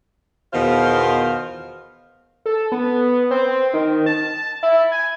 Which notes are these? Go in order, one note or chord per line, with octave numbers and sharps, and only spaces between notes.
E2 B2 D#3 F4 C5 F5
A4
B3
C4
D#3
A5
E4
G#5